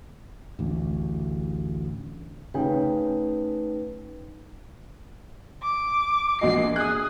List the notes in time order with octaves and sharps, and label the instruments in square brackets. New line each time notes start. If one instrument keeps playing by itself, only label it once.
[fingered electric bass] A1 D2
[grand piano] C#3 C#4 G5 [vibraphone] A3 D#4 B4
[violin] D6
[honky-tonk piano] A#1 F#4 D#5 [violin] C7
[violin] G#4 [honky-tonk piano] D#6 F#6